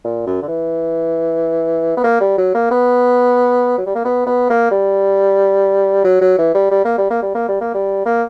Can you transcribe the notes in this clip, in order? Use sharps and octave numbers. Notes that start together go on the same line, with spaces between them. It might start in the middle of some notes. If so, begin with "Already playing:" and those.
A#2
F#2
D3
E3
B3
A#3
G3
F#3
A#3
B3
F#3
G3
A#3
B3
B3
A#3
G3
F#3
F#3
E3
G3
G3
A#3
G3
A#3
G3
A#3
G3
A#3
G3
A#3